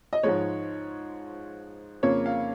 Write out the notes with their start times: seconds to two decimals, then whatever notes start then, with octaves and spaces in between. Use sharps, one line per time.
0.13 D#5
0.23 G#2 F3 G#3 C#5
2.03 F2 C#3 A#3 C#5
2.26 F5